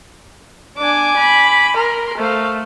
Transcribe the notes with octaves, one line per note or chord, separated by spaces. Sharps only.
D4 G#5 D6
B5
A#4 C6
A3 C5 F5